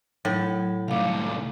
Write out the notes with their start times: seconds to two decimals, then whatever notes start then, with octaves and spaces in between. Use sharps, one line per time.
0.25 A2 F#3
0.88 C2 A3 F5 D6